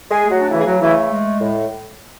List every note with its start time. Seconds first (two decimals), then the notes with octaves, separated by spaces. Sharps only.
0.11 G#3 G#4
0.21 A3
0.31 F#3 F#4
0.41 D4
0.51 C#3 E3 E4
0.60 G#4
0.65 F#3 F#4
0.80 E3 A3 E4
1.10 G#3
1.40 A2